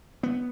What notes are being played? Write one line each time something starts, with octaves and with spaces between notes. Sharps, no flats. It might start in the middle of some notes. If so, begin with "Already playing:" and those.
B3